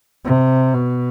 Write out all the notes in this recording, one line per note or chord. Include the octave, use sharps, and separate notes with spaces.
C3
B2